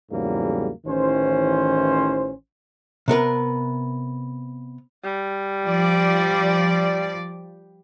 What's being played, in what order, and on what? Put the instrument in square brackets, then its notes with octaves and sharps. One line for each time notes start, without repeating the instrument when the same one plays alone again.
[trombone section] E2 G#2 C#3 F#3 G3 A#3
A1 D#3 E3 C#4 C5
[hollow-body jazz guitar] C3 B3 A#4 B4
[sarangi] G3
[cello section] F3 D5